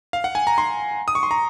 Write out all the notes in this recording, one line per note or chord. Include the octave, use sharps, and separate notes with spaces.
F5
F#5
G#5
A#5
C6
D#6
C#6
C6
A#5